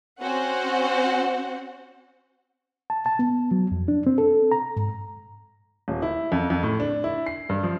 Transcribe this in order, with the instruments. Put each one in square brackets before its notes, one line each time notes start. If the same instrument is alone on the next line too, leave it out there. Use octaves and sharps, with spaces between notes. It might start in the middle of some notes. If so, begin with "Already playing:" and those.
[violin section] C4 C#4 F#4 C5 F#5
[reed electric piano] A5
A5
B3
F#3
F2
D4
C4
A4
A#5
G#2
[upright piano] D#1
E4
F2
F2
A2
D4
E4
C7
G2
F3